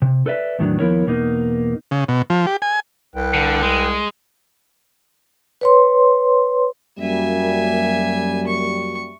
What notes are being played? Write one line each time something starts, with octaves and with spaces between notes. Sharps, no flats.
C3
A4 B4 D5 E5
E2 A2 D#3 F3 F#3 D4
D#2 F3 B3 E4 A#4 C#5
E2 B2 A#3 D#4
C#3
B2
F3
G4
G#5
C2 B4 G5
D3
G#3
B4 C#5 C6
F#2 G3 A#3 E5 G#5
C#6